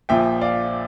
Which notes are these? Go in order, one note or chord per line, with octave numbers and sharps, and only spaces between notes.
A#1 A#2 F3 E5 G5
D5 F5